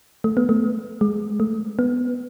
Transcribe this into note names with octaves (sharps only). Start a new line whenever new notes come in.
A3
B3
A3
G#3
A3
B3